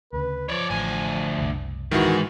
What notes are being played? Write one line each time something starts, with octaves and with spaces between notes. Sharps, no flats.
D2 C#3 B4
F3 C#5 D5
A1 D2 G#5
F#1 C2
G#2 D#3 E3 E4 F#4 G#4